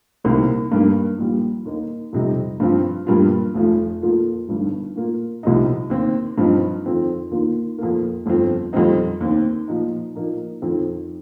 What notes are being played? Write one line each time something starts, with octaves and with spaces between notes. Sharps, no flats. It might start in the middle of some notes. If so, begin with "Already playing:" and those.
C2 C3 D#3 A#3
G2 G3 A#3
A#1 A#2 G3
D#2 D#3 A#3 D#4
F2 C3 G3 D#4
G2 F3 C4 F4
G2 G3 A#3 F4
F1 F2 F3
F2 F3 A#3 F4
G1 G2 D#3
A#2 A#3 F4
C2 C3 F3 D#4
D#2 D#3 C4
G2 F3 C4 D#4
F2 D#3 C4 F4
D#2 D#3 A#3 F4
F2 F3 A#3
G1 F2 F3 C4 F4
F2 D#3 G3 C4 D#4
D#2 D#3 C4
A#2 F3 D#4
A#2 F3 A#3 D#4
F2 D#3 C4 F4